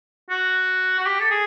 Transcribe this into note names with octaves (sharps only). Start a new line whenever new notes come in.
F#4
F#4
G4
A4
G#4